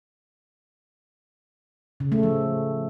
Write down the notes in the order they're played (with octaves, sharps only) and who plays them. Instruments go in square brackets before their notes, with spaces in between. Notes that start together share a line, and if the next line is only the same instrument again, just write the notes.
[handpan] C#3
A3
F3